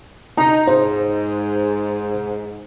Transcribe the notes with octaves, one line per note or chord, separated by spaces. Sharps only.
D#4 A#5
G#2 C5